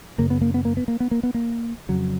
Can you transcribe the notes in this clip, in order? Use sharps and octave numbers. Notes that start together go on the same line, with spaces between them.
F#2 C#3 A#3
B3
A#3
B3
A#3
B3
A#3
B3
A#3
B3
A#3
F2 C#3 F#3